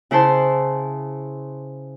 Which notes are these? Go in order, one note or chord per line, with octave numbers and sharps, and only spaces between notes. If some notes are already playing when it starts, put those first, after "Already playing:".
C#3 E4 C5 A5 C6